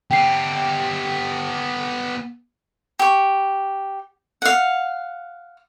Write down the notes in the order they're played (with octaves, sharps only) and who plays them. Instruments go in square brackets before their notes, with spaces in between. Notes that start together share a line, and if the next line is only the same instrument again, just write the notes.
[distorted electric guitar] B3 G4 [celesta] G5 C7
[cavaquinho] G4 C#6
F5 F#5